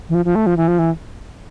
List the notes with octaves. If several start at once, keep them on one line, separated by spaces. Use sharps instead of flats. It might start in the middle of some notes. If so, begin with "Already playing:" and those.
E3
F3
F3
A3
F3
E3
F3
E3